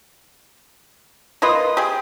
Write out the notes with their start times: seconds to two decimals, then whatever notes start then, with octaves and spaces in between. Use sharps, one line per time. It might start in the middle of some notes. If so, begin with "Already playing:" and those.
1.42 A#3 F4 B4 D#5
1.77 G4 G#4